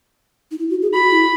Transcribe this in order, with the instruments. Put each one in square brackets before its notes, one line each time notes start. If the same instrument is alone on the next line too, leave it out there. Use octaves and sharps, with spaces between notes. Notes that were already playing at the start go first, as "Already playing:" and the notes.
[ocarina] D#4
E4
F#4
G#4
[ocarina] F#4 [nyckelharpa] B5
[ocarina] E4